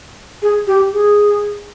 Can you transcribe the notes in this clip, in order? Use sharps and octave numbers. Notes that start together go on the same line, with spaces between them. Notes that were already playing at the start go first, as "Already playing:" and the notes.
G#4
G4
G#4